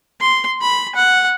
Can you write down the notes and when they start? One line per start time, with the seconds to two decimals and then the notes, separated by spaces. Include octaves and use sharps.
0.20 C6
0.61 B5
0.95 F#5